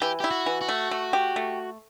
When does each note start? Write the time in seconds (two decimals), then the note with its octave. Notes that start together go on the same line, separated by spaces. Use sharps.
0.01 E3 G4
0.20 E4 G4
0.31 F#4
0.46 E3
0.61 F#4
0.69 A3
0.91 A3
1.13 G4
1.36 A3